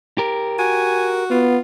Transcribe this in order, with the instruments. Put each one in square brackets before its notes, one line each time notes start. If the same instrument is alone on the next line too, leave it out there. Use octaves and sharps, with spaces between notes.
[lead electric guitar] G4 A#4
[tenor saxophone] F#4 [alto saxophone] G#5
[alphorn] B3 [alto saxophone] F4